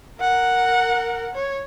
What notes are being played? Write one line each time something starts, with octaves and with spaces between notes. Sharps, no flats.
A#4 F#5
C#5